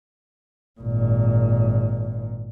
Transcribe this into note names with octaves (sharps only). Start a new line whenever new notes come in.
G#1 A#2